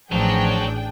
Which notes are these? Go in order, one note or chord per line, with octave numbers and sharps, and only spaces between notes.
A1 F3 F#3 D4 G#4 G5